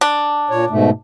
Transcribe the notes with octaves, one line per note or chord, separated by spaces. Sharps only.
D4
A#2 C#5
G#2 B2 A3